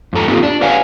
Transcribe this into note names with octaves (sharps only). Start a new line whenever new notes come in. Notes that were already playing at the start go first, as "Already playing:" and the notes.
F2 G#2 A4 A#5
A3 A#3 C4 D#4 F4 G4
D4
G4 B4 C#5 F5 F#5 G#5